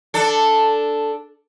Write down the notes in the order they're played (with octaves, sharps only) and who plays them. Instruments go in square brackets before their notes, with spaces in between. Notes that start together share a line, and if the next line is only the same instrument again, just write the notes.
[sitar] D4 A4